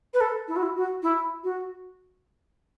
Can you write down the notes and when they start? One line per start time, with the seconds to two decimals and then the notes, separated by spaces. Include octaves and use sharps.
0.13 B4
0.20 A4
0.47 E4
0.55 F#4
0.62 E4
0.76 F#4
1.02 E4
1.43 F#4